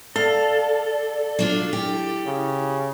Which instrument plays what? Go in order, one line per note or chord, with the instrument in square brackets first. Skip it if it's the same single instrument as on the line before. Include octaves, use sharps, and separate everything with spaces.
[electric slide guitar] A4 [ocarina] D5 [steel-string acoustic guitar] F5
[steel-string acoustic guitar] F#3 D4 F4
[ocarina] E4 [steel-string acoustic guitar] G4
[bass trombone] C#3